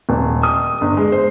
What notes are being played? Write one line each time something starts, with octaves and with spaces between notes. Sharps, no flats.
D#1
D#6
G1
G#3
C5